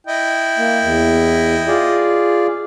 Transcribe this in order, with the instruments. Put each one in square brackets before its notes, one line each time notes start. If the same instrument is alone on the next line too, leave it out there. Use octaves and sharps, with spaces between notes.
[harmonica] E4 D#5 G5
[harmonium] A#3
E2
F4 G#4 D5